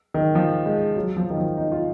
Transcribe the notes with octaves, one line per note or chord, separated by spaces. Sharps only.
D#3
F3
G#3
F#3
F3
D#3
F3
D#4
F4